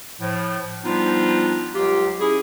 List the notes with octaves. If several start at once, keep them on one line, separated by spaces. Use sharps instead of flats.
A2 F3
F3 G3 B3 D4 D#4 F4
C#2 F#3 F4 G4
C#4 E4 G#4